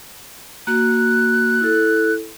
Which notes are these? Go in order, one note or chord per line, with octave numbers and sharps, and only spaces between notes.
A#3 F#4 F#6
E4 A4